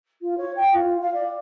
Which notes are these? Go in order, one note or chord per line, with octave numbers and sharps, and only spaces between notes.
F4
C#5
G5
F4
F5
D5